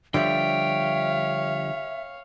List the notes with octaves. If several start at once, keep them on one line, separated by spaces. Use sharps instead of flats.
D3 F3 G3 C#5 E5 F5 G5